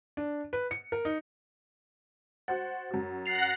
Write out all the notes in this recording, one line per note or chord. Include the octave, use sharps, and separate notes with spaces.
D4
B4
C#7
A#4
D#4
F#4 C5 F#5 A6
F#2 F#4
F#5 F#6 A6 A#6 C7 F7